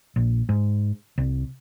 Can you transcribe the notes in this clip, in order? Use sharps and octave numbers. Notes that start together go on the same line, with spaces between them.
A#1
G#2
C2